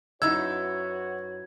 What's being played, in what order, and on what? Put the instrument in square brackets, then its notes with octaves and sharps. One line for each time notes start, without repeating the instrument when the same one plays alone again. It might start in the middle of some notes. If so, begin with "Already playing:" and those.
[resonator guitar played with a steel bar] F#2 D#4 E4 [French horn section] F#4 B4 C#5 [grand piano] E6 [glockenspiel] G#6